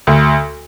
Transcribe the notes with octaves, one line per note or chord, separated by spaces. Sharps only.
D2